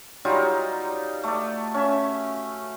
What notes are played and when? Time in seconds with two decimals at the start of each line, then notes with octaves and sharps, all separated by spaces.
0.25 F#3 G3 D#4 F4
1.24 A3 D5
1.74 C#4 E5